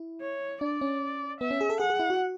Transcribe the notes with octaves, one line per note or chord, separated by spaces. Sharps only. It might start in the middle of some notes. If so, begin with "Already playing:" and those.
Already playing: E4
C#5
D4 D5
C#4
B3 E5
C#4
G#4
A4
G#4 F#5
G#4
E4
F#4